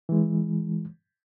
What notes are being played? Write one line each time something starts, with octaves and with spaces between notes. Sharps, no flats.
E3 G#3